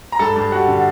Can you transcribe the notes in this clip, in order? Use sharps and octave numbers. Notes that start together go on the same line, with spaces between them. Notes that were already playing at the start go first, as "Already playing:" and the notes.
A#5
G2 A4 A5
G2
G3 F#4 F#5
D3